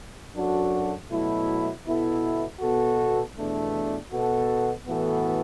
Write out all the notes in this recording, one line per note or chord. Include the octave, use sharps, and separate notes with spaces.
F#2 F#3 D4 F#4 A4
B2 F#3 A3 E4
B2 B3 E4 A4
B2 B3 F#4 A4
E2 B2 A3 D4
B2 B3 F#4 A4
A2 E3 B3 F#4 A4